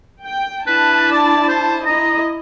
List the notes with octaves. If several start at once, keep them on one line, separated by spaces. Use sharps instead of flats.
G5
D4 E4 B4 A5
D5
C5
E4 D#5 A#5